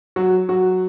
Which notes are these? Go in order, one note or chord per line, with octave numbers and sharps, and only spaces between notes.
F#3 F#4
F#3 F#4